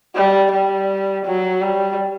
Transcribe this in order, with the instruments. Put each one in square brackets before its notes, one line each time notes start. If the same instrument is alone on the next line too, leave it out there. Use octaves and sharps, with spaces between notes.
[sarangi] G3
G3
F#3
G3